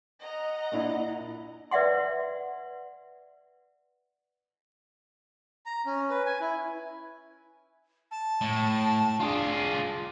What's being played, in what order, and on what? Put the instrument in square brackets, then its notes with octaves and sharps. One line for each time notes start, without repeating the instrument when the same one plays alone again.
[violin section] D#5 F#5 A#5
[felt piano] A#2 D4 E4
[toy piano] B4 D5 E5 F#5 C6
[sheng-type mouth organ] A#5
C#4
B4
G#5
E4
[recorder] A5
[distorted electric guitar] A2
[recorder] D4 [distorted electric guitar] F4 G#4